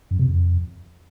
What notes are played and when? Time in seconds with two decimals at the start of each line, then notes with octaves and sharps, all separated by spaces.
0.11 F#2
0.19 C3
0.28 F2